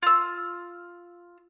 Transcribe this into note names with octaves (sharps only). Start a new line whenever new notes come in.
F4 E6